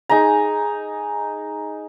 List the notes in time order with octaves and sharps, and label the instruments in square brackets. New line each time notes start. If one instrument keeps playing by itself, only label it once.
[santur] D#4 G#4 G#5 A#5